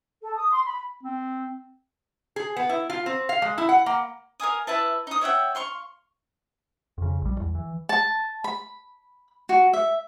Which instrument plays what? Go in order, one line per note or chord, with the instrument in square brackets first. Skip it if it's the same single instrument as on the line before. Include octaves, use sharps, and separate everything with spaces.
[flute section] A4
D#6
C6
B5
[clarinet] C4
[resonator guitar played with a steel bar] G#4
B3
E4
F4
C4
F5
G#3
E4
F#5
A#3
[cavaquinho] A#4 F5 G#5 D#6
E4 B4 E5 A5
D#4 D#6
C#5 E5 F#5 G5
F5 C6 C#6
[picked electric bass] F2 C#3
A#1 G3
E2
E3
[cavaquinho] A5
B5
F#4
E5